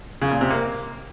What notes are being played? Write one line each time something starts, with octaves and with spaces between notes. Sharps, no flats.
C#3
A#2
C3
A#3